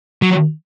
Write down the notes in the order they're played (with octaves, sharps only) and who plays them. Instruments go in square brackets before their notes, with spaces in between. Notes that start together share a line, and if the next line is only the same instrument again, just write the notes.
[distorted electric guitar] F#3